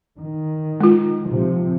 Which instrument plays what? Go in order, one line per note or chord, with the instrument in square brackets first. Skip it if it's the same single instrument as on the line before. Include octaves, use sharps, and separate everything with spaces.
[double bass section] D#3
[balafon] G#3 F4
[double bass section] C3 F3